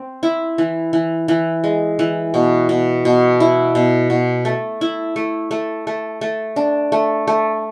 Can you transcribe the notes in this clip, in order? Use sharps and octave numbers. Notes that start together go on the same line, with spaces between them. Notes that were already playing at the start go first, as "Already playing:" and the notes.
Already playing: C4
E4
E3
E3
E3
G#3
E3
B2
B2
B2
E4
B2
B2
A3
E4
A3
A3
A3
A3
D4
A3
A3